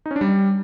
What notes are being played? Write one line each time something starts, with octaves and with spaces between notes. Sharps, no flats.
D#4
C#4
D4
G3